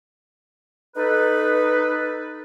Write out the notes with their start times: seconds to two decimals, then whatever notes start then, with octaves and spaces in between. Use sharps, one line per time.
0.96 D#4 A4 B4